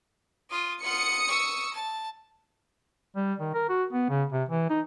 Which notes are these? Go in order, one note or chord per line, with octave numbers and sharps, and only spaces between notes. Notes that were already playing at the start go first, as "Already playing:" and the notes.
F4 D#6
F4 F#5 D#6 C#7
C#6 E6
A5
G3
D#3
A#4
F#4
B3
C#3
C3
E3
D#4